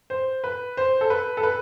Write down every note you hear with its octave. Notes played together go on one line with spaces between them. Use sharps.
C5
B4
C5
A4
B4
A4
B4